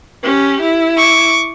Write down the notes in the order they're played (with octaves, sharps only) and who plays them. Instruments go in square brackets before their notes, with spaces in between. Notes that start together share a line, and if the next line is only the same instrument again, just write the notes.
[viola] C#4 G4
E4
[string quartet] C#6 D6